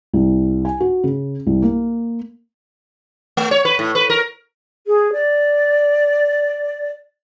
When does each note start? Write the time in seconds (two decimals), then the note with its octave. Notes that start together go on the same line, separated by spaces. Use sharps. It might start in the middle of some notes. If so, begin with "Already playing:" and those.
0.14 C2
0.65 G#5
0.80 F#4
1.04 C#3
1.47 C2
1.62 A#3
3.37 A3
3.51 C#5
3.65 B4
3.79 A2
3.95 B4
4.10 A#4
4.87 G#4
5.12 D5